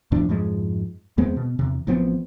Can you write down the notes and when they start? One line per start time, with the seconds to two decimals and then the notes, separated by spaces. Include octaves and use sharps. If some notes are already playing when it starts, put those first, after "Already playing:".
0.12 E2 A2 F3 D4
0.29 F2 G#2 F3 G#3
1.18 E2 G#3 B3 C4
1.36 B2
1.59 E2 C3
1.87 A1 F3 B3 C4